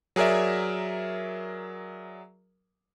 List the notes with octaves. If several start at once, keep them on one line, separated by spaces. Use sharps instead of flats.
F#3 G#4 A#4 D5 E5